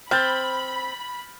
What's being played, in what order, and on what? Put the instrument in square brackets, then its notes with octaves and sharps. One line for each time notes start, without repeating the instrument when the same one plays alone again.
[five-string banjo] C4 [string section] B5 [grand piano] F6 G6 A6